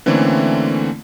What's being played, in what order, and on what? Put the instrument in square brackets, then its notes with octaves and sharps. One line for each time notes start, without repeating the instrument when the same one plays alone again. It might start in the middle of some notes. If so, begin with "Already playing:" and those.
[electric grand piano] D3 E3 A3 A#3 C4 C#4